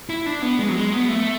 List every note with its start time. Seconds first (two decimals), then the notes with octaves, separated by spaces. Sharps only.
0.10 E4
0.26 D4
0.42 B3
0.59 G#3
0.68 F#3
0.75 G#3
0.92 B3
1.08 A3